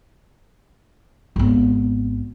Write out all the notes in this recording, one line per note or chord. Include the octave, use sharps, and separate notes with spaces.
G#1 B3